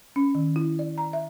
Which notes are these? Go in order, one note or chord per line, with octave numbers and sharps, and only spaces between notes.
C#4
D#3
E4
D5
A#5
E5